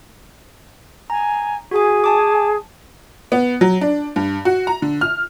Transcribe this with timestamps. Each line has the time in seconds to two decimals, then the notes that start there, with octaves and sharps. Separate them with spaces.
1.10 G#5 A#5
1.71 F#4 G#4 G#5
2.04 G#5 A5 D6
3.32 B3
3.61 F#3
3.81 D4
4.16 G2
4.45 F#4
4.67 A#5
4.82 D3
5.01 F6